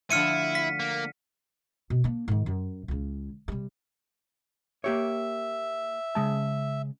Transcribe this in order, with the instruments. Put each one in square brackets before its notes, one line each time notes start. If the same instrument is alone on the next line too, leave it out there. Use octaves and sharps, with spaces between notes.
[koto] D3 F3 A3 [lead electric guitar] E4 [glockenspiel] F6 C#7 D#7
[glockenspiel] B6
[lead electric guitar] A#3
[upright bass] B2
A#3 D4
G#2 D#3
F#2
C#2 C#3
C3 G3
[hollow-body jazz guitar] A#3 G4 C#5 [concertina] E5
[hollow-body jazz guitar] C#3 G#3 A5